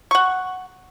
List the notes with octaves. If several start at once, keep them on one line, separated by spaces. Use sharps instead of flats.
F#5 C#6